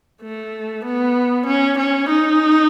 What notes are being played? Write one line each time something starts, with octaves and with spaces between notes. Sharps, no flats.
A3
B3
C#4
C#4
D#4